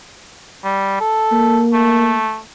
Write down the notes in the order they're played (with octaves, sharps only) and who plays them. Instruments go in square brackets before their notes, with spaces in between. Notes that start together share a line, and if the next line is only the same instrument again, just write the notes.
[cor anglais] G3
A4
[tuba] A#3
[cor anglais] A3